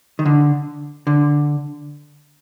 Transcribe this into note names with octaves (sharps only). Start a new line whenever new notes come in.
D#3
D3
D3